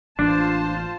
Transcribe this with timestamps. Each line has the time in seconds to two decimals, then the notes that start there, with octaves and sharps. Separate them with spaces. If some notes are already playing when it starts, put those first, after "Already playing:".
0.19 A1 E3 A#3 D4 F4 C5 A5